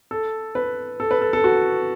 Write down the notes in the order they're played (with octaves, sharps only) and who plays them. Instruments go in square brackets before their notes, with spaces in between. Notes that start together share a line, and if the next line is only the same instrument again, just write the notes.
[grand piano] A4
B4
A4
B4
A4
A4
F#4